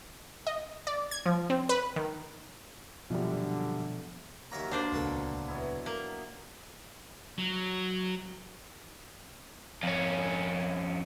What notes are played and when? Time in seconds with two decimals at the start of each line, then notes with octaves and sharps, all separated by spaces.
0.47 D#5
0.87 D5
1.11 G#6
1.26 F3
1.50 C4
1.69 B4
1.96 D#3
3.10 A#1 F#2 B2 D3 F3 G3
4.51 D#2 F#3 A#3 E5 A#5
4.71 D3 A#3 D4 C5 D5
4.92 D#1 C#2 B2 A4
5.48 F#3 B3 E4
5.86 A#3
7.38 F#3
9.83 F2 C#4